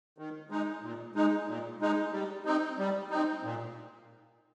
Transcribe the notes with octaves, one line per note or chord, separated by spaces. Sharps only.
D#3
G#3 D#4
A#2
G#3 D#4
A#2
G#3 D#4
G3
C4 D#4
G3
C4 D#4
A#2